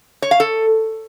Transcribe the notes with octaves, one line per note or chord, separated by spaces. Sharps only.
C#5
F5
A4